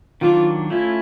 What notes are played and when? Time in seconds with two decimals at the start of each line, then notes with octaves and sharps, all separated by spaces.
0.21 D#3 F#3 A#3 D4 F4
0.70 A3 C#4 E4 F4